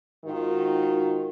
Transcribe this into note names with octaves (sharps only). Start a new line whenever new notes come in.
G#2 D#3 F4 F#4